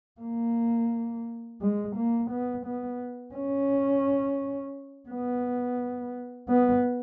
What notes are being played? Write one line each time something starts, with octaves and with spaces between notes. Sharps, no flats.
A#3
G#3
A#3
B3
B3
C#4
B3
B3